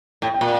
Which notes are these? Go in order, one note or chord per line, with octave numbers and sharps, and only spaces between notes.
A2 G5
G5
A#2